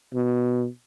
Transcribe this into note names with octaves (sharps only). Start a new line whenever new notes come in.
B2